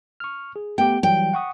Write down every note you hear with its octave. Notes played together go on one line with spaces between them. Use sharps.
C#6 F6
G#4
A3 B3 G4 G5
E3 F#3 G3 G5
F#5 C#6 D#6